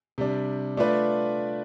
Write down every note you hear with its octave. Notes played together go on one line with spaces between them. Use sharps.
C3 G3 D4
A3 D4 F4 B4 D5